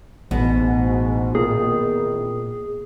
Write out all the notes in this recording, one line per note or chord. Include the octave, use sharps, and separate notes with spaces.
A1 G#2 B2 F#4
E2 A#2 D#3 C4 G#4